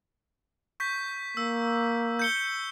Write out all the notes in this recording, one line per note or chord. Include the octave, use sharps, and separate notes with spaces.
C#6 G6 B6
A#3 E6
G6 C#7 G7